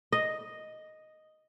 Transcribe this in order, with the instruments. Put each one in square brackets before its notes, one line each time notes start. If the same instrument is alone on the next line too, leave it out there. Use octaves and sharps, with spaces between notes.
[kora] D#5